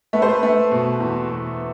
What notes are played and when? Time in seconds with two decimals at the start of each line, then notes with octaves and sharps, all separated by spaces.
0.13 A3 B4
0.22 C5
0.30 B4
0.43 A3
0.72 B2
1.00 E2
1.29 B2